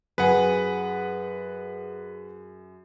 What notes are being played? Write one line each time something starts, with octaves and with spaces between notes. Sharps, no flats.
F#2 G#4 B4 F#5